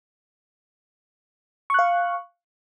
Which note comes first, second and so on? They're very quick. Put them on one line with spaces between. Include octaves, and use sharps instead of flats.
C#6 F#6 F5